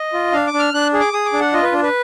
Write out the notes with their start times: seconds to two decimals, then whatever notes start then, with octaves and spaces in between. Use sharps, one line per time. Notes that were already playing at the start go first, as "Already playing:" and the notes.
Already playing: D#5
0.13 F4
0.32 D4 F5
0.47 D6
0.54 D4
0.59 F6
0.74 D4 F#6
0.93 G#4
1.00 D6
1.13 G#4 D#6
1.26 D6
1.33 D4
1.40 F#5
1.54 F4 D#5
1.63 B4
1.72 D4
1.83 B4